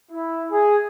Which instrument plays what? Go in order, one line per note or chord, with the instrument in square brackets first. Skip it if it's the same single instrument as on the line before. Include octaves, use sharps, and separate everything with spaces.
[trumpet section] E4
G#4